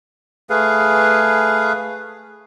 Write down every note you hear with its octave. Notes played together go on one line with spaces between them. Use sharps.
A3 G#4 B4 F5